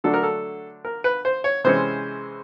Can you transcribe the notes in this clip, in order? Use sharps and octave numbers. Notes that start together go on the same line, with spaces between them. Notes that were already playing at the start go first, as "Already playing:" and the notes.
D3 F#3 A3 D4 A4
A#4
A4
A#4
B4
C5
C#5
C3 E3 G#3 C#4 C5